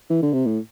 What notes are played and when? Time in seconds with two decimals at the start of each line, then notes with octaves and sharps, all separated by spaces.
0.10 E3
0.23 D3
0.33 C3
0.46 A2